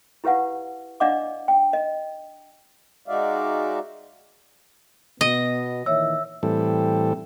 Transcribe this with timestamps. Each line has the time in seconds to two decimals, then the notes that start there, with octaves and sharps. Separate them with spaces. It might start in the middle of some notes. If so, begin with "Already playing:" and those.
0.24 E4 G4 B4 F5 F#5
1.00 D4 D5 D#5 F5 F#5 D6
1.48 G5
1.73 D#5
3.08 G#3 D#4 F#4 D5 E5 F5
5.21 B2 B3 D#5
5.86 A#2 D#3 E3 C#5 E5 E6
6.43 A2 E3 G3 C4 A4